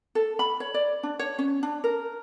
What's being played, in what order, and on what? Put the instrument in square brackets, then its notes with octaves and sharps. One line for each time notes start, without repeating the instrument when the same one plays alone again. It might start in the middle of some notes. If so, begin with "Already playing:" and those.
[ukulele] A4
B5
C#5
D5
D4
C#5
C#4
D4
A#4